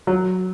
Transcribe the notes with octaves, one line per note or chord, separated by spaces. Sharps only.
F#3